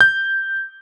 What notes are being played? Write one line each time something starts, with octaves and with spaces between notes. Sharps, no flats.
G6